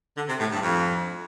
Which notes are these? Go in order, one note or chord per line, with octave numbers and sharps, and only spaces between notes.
D3
C3
A2
G2
F2